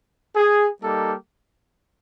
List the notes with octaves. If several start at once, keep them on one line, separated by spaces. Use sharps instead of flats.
G#4
G3 A#3 D#4 G4 A4